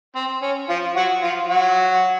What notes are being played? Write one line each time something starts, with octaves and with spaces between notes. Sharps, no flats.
C4
C#4
F3 F4
F#3 F#4
F3 F4
F#3 F#4